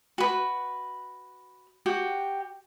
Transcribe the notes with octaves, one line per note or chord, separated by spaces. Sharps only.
F#4 B4
F#4 G4 G5